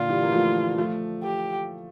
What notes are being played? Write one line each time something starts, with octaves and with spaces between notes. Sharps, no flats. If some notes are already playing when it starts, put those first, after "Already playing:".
Already playing: A#2 D3 F4
E3 G3
A#3
F3 A3
F3 A3
G4